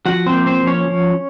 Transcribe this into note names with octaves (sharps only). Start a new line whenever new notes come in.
F3 F#4 F#5
C4 C5
A#3
C4 C5
F3
C#4 C#5
F3